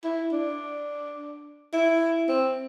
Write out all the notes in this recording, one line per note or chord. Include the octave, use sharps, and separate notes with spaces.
E4
D4
E4
C4